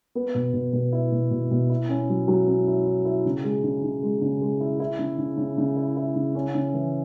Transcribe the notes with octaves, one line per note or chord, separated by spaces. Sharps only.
B3
B2
B2
B2
E4
B2
B2
B2
E4
C#4
F#3
F#3
C#4
E4
E4
E4
C#3
G#3
C#3
C#3
G#3
C#3
G#3
E4
E4
C#3
C#3
C#3
C#3
E4
E4
C#3
C#4
C#3
E3